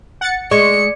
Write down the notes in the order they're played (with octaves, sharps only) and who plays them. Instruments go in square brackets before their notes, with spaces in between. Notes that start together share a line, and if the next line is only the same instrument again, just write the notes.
[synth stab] F#5 A6 C#7
[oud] G#3 [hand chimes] D5 [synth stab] C#6 [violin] C#7